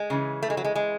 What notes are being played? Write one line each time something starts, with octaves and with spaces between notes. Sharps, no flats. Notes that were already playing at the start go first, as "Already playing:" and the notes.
Already playing: G#3
C#3 E3
A3
G#3
F#3
G#3
G#3